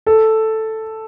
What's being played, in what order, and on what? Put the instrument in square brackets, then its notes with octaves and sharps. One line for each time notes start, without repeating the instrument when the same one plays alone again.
[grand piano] A4